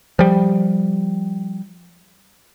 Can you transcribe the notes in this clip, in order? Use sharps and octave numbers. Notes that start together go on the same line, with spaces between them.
F3 G3